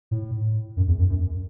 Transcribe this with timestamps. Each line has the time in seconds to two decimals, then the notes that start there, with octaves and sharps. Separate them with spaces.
0.11 A2
0.77 F#2
0.88 E2
0.99 F#2
1.09 F#2